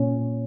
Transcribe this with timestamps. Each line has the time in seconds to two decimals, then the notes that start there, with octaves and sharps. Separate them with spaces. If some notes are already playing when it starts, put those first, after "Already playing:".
Already playing: A#2 C#4